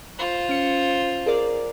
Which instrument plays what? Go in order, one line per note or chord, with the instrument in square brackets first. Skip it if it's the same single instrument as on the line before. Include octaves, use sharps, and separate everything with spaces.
[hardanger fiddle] F4 C5
[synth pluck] C#4 C#7
G#4 A#4 D5